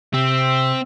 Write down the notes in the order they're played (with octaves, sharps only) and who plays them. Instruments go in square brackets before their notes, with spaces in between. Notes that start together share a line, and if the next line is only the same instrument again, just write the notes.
[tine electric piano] C3 [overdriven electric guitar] C4 [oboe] E5